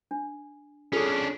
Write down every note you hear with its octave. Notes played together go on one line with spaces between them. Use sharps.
D4
C#4 D4 F4 G#4 A4